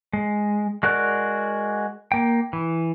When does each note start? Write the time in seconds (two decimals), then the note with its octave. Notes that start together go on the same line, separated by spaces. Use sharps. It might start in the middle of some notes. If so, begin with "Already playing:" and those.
0.13 G#3
0.83 G#3 F#4 A#4 D5 F#6
2.12 A#3 G5
2.53 E3